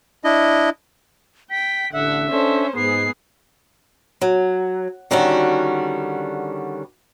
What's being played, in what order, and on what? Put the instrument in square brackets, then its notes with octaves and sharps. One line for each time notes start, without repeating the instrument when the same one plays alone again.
[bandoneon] D4 E4 D#5
[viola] G5 [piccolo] B6
[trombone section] A1 D3 [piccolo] E5 [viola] F#5
[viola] C#4 C5 [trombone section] D4 A4
[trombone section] G#2 [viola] B3 G#4 [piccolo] C7
[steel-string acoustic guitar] F#3
D3 D#3 G3 C#4 D4 F#4